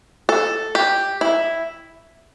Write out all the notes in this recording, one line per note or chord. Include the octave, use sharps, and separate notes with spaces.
A4
G4
E4